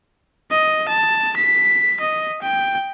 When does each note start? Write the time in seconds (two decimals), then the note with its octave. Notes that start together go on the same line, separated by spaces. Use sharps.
0.51 D#5
0.89 A5
1.37 B6
2.01 D#5
2.42 G5